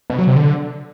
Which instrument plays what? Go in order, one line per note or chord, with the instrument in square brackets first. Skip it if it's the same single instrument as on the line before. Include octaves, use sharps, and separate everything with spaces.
[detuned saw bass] B2
F#3
C3
D3